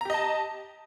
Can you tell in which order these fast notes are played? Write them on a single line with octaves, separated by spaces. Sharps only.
A#5 G4 D#5 A5